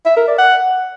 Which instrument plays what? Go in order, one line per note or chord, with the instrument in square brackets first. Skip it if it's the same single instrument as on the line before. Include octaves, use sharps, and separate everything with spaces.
[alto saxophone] E5
A#4
D5
F#5